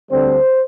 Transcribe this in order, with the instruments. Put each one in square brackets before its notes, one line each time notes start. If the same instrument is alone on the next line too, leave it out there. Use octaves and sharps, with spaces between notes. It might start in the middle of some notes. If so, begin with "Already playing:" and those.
[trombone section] D2 D3 G3 C4 C5